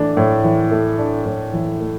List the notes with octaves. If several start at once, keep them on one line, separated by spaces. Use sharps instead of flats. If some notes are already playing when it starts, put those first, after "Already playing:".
Already playing: A2 E3 A3 D4
A2
E3
A3
D4
A2
E3
A3